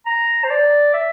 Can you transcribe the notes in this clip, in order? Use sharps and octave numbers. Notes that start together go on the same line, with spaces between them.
A#5
C5
D5
E5